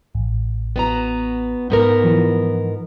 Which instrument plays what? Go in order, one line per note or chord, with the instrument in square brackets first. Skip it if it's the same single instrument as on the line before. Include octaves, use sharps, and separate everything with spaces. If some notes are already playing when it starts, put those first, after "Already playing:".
[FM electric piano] A1
[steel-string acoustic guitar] B3 F#4 A#5
G#2 B3 A#4
[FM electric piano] E3 F3